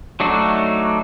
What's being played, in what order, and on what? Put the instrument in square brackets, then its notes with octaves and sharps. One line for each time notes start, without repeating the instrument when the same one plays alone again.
[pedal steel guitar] F#3 A3 D4 D#4 F#4